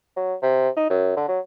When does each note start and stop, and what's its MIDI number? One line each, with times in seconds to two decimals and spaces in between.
0.17 0.35 54
0.42 0.69 48
0.77 0.90 63
0.90 1.12 42
1.17 1.28 50
1.29 1.39 54